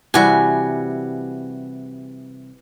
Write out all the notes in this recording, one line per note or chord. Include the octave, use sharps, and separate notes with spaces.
C3 E3 G3 F#4 G#5